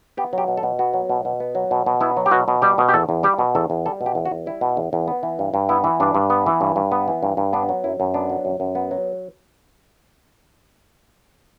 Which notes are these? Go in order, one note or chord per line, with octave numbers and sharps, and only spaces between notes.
B3 G4
F#3 G4
B2
A4
B2
B3 F#4
F#3
B2
B2
B3
F#3
B2
B2
B3 E4
F#3
G4
B2 F#4
B2
G3 G4
B2
G4
E2 A4
E2
G3 G4
B2
E2 A4
E2
G3 A4
B2
G4
E2
F#4
E2
G3 E4
B2
E2
E2
B3
E3
G2
G2
B3 E4
E3
G2 D4
G2
B3
E3
G2
G2
B3
E3
G2
G2
B3 D4
F#3
F#2 E4
F#2
B3 D4
F#3
F#2
F#2
B3
F#3